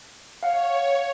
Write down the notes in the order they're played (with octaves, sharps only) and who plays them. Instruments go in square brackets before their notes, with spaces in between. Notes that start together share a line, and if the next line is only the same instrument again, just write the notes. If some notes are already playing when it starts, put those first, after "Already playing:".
[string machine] C#5 [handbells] F5 F#5